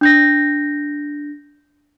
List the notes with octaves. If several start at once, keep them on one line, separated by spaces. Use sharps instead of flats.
D4 G6 A#6